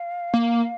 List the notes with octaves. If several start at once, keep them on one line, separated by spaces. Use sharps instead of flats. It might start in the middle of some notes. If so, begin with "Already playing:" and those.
Already playing: F5
A#3